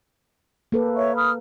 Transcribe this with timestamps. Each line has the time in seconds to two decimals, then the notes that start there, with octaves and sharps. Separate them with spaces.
0.72 A#3 G4 A4 B4
0.95 C#5 E5 C#6
1.16 B5 D#6 F6